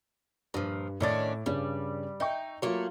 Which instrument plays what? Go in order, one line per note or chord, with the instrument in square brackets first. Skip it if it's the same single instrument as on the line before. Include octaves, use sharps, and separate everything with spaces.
[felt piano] G2 [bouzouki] A#2 F3
[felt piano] A2 D6 A6 [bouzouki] D#3 C#4 D4
[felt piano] G2 C#3 C#5 [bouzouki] G3
[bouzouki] D#4 [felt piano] E5 G5 C#6
[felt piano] F#3 F4 [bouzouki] A3 A#3 C#5